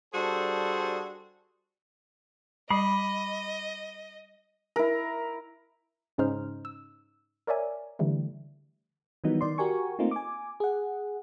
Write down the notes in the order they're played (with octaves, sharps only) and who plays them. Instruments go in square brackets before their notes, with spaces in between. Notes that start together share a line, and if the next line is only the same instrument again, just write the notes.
[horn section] G3 D4 F#4 G#4 A4 C5
[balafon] G3 [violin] D#5 [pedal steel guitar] B5 D6
[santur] E4 A#4
[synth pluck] G#2 C#3 C#4 D#4 C5 F6
E6
A#4 C#5 D5 E5 G#5
D3 E3 G3 A3
[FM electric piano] D#3 E3 F#3 G3 B3 D#4
D#3 D5 C6
F#4 G4 A#4 G#5 C#6
A3 A#3 C4 D#4 F4
G#5 D6
G#4 F#5